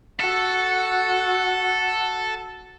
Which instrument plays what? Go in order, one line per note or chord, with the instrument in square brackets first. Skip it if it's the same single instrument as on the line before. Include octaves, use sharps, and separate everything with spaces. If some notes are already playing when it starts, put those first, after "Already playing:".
[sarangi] F#4 [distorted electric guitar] A4